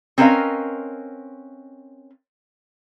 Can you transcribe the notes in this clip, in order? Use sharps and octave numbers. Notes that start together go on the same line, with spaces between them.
C4 C#4 A#4 B4 D#5 F5